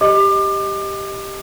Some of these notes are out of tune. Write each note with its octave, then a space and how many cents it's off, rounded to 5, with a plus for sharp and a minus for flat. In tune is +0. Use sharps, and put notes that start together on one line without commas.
G4 +0 D#5 +5 D6 +30